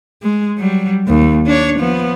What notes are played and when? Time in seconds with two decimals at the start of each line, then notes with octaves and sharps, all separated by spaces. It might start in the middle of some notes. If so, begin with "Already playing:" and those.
0.22 G#3
0.58 F#3 G3
1.08 D#2
1.46 D4 C#5
1.79 F3 B3